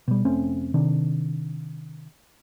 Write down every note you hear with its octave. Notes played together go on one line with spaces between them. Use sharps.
B2 G3
F1 A3 C4 C#4
C3 D#3 D4